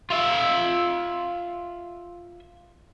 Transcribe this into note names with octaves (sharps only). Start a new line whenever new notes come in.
F4 E5